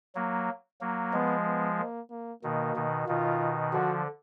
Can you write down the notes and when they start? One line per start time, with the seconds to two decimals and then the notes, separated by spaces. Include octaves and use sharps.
0.15 F#3 A#3
0.81 F#3 A#3
1.13 F3 G#3 B3
1.46 B3
1.78 A#3
2.10 A#3
2.43 B2 D#3 A#3
2.76 B2 D#3
3.08 B2 D#3 F4
3.73 D3 F3 F#4